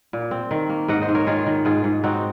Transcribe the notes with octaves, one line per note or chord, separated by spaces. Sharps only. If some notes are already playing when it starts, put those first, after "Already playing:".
A#2
C4
D#3
A#3
G#2 D#5 F#5
C5 D#5
G#2
A#4 C#5
D#3 F4 G#4
D#3
G#2 F4 G#4
G#2
C4 D#4 F#4